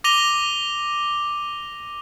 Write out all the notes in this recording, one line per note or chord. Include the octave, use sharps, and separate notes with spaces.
D6 A#6 D#7 F7 G7